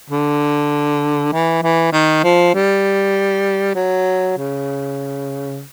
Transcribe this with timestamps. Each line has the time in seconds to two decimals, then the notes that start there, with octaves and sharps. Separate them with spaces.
0.10 D3
1.32 E3
1.63 E3
1.92 D#3
2.24 F3
2.54 G3
3.76 F#3
4.38 C#3